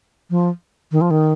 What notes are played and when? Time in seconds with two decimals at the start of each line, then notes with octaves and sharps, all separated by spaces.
0.30 F3
0.92 D#3
1.01 F3
1.11 D#3